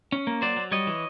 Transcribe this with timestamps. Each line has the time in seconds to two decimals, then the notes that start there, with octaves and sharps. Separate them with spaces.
0.12 C#4
0.27 A#3
0.42 F#3 C5 D5
0.57 F#3
0.71 G3 C#5 D#5
0.87 E3